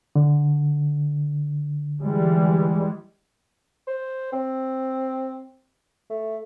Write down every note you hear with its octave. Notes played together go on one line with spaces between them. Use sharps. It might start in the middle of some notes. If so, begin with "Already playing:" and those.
D3
E3 G3 G#3
C5
C4
A3